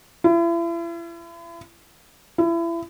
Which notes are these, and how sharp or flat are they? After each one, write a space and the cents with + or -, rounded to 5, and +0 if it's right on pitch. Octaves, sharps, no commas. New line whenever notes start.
E4 +40
E4 +30